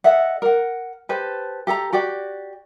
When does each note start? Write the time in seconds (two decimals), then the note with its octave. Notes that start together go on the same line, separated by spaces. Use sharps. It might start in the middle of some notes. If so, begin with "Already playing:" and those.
0.04 A4 D#5 E5 F#5
0.42 A#4 F#5
1.09 G4 A4 B4 C5
1.67 G4 A4 F#5 A#5
1.93 F#4 G4 D5 G5